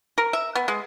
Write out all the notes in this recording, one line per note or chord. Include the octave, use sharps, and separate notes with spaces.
A#4
E5
B3
G#3